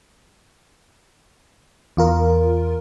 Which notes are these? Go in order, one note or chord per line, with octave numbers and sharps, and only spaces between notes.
E2 F4 A#4